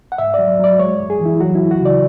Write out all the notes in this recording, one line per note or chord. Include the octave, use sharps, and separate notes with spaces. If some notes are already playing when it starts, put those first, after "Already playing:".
F#5
G#2 E5
F#3 D5
F#3 D5
G#3 C#5
F#2
G#4
E3
E4
F#3 F#4
E4
D2
F#4
C#3 D5